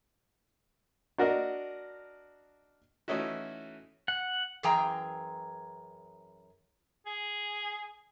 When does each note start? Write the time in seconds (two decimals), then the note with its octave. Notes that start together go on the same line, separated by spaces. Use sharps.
1.18 D4 F#4 A#4 D#5
3.08 E3 A3 C#4 D#4 E4 F#4
4.08 F#5
4.63 F#2 E3 G#4 G5 A#5
7.06 G#4